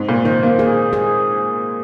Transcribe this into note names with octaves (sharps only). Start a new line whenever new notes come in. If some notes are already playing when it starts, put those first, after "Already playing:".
Already playing: G#2 C4
A#2
D#3 C5
A#3
A#3 G#4
G#4